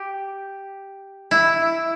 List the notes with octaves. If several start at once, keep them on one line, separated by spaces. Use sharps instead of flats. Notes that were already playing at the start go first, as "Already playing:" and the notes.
Already playing: G4
E4